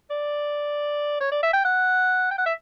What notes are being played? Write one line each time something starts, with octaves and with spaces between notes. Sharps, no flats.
D5
C#5
D5
E5
G5
F#5
G5
F#5
E5